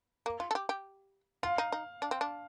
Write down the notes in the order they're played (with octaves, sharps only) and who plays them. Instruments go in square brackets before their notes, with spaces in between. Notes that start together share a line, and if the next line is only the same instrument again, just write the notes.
[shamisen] A#3
F4
A4
G4
G4
[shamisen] F4 [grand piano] F5
[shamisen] D#4
D#4
D4
C4
D4